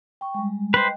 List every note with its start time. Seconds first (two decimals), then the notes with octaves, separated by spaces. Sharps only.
0.21 G5 C#6
0.34 G3 G#3
0.74 B4 C5 D#5 G5